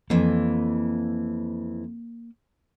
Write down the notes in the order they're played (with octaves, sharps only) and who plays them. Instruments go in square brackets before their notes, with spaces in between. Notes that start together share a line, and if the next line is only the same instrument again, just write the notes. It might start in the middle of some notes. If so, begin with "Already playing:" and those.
[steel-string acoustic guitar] F2 E3 [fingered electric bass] A#3